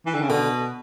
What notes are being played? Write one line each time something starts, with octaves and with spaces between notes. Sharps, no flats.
E3
D3
C#3
B2 D3